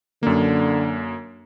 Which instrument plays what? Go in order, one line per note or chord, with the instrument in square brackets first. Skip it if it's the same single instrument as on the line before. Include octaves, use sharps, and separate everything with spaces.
[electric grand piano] F#2 A#3 [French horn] D3